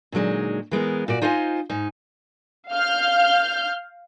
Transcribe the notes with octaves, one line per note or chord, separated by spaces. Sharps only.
A#2 D3 F#3 G#3 D#4
E3 G#3 B3 A#4
A#2 F#4 D5
D#4 F4 C5 D#5 F5 G#5
G#2 D#4 G#5
F5 F6 G6